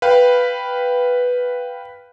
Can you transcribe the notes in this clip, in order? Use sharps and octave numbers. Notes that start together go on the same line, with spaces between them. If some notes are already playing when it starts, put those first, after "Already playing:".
B4 F5 G5 B5